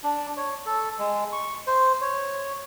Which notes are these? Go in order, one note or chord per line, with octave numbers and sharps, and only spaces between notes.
D4
C#5
A4
G#3
C#6
C5
C#5